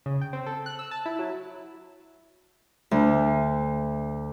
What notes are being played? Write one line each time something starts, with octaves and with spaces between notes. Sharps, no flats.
C#3
G5
C4
A4
F#6
E6
A5
E4
F#3
D2